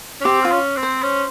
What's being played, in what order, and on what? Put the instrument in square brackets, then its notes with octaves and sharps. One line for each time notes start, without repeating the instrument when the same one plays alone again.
[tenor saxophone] C#4
[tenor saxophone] C4 [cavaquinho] G4
[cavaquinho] F4
[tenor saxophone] C#4
C4
[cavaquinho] C5
[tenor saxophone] C#4